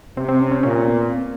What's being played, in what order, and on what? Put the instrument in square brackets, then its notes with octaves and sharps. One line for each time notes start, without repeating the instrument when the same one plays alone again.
[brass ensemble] C3 [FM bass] C4
[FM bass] C4
C#4
C#4
[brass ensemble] A#2 [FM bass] C#4
[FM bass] B3
C4